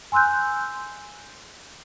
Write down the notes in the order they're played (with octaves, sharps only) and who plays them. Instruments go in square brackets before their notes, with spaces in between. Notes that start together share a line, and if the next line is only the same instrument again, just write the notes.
[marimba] G#5 C6 E6 F#6 G6